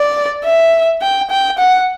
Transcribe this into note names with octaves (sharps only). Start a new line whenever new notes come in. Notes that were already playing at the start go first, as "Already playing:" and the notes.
Already playing: D5
E5
G5
G5
F#5